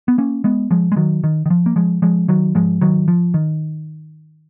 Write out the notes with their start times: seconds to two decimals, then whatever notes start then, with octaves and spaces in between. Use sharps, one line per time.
0.08 B3
0.18 A#3 C#4
0.44 G#3 B3
0.71 F3 G#3
0.92 G#3
0.96 D#3 F#3
1.24 D#3
1.46 D#3
1.50 F3
1.66 A#3
1.76 F3 G#3
2.02 F3 G#3
2.28 D#3 F#3
2.55 G#2 F3 G#3
2.81 D#3 F#3
3.08 F3
3.34 D#3